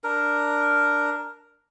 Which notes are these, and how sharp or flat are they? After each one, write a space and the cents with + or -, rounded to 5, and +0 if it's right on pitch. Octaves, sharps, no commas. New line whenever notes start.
D4 +0 A#4 +0